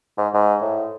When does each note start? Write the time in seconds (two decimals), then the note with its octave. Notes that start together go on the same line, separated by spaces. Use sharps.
0.18 G#2
0.34 G#2
0.61 A2